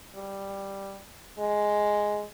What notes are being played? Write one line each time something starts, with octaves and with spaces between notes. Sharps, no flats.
G3
G#3